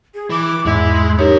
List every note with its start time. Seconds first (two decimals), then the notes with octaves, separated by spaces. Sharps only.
0.14 G#4
0.30 E3 D6
0.65 E2 G#2 G#3 E4
1.19 F#2 D#4 G4 A#4 C#5